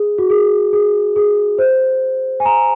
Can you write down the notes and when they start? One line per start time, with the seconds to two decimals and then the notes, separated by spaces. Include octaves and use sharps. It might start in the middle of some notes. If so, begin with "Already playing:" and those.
Already playing: G#4
0.18 F#4
0.30 G#4
0.73 G#4
1.16 G#4
1.58 C5
2.40 G#5
2.45 A#5